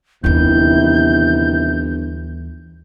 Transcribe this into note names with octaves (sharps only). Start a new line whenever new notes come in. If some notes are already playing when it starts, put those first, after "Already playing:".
G1 D#2 C3 D#3 E3 E4 G6